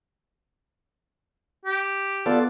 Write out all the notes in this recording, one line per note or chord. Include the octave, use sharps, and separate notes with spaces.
G4
B3 F4 A4 D5